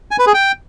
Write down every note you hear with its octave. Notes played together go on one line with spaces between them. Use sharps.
G#5
B4
G#4
G5